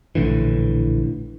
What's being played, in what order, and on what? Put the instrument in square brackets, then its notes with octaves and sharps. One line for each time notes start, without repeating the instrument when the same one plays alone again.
[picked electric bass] A#1 A2 D3 E3